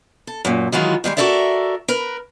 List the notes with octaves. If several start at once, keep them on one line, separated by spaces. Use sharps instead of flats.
A4
F#2 A#2
D#3 E3 F#3 G#3 F4
D#3 F3 G3 G#3
F#4 G4 A4 A#4 D5 E5
A#4 B4